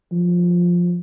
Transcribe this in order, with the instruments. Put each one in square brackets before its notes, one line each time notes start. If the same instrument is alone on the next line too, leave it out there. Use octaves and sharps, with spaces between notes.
[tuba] F3